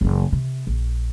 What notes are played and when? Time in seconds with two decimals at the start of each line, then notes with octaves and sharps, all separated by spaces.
0.01 F#1 E3
0.33 C3
0.67 A#1